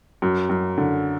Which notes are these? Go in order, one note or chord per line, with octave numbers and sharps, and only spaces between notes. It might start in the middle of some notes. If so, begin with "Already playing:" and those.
F#2
F#2
D3